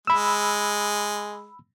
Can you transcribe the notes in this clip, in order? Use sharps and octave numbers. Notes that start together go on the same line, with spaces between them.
G#3 B5 E6